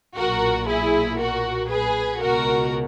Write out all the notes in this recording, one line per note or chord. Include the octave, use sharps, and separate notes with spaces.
B1 A#2 F#4 A#4
E4 G#4
F#4 A#4
G#4 B4
C#2 B2 F#4 A#4